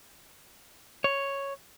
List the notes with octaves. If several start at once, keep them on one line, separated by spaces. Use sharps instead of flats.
C#5